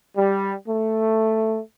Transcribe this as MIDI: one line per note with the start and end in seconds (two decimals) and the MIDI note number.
0.16 0.53 55
0.67 1.58 57